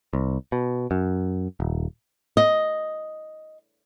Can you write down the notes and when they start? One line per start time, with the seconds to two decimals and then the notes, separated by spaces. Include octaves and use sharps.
0.13 C2
0.52 B2
0.91 F#2
1.60 D#1
2.37 D#5